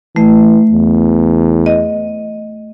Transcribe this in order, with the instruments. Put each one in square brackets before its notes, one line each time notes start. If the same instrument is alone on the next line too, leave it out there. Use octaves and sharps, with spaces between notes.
[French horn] E3 [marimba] A3
[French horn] E2
[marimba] D#5